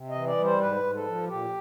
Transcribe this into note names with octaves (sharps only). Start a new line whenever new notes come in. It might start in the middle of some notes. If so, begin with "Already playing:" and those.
Already playing: C3
D#5
E3
D5
G3
C5
G#2 B4
G#2
A4
F3
A#2 G4